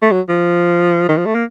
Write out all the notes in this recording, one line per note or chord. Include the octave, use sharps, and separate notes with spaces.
A3
F#3
F3
D#3
F3
A3
A#3